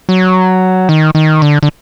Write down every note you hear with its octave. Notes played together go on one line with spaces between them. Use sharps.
F#3
D#3
D#3
D3
D3